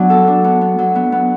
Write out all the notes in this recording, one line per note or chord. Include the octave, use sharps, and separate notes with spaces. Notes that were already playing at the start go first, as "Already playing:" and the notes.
Already playing: F#3 B3 D4
A4
D4
B3
B3
F#3
B3
B3